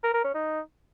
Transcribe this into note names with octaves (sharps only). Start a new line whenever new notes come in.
A#4
A#4
C#4
D#4